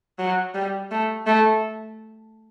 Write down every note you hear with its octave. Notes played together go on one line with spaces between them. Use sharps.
F#3
G3
A3
A3